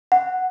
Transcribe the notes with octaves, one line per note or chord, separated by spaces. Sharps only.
F#5